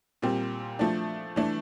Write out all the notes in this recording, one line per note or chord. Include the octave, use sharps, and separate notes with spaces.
A#2 G3 C4
F3 A3 D4
E3 A3 D4